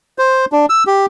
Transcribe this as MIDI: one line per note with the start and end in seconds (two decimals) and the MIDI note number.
0.18 0.45 72
0.52 0.66 62
0.70 0.84 88
0.87 1.06 67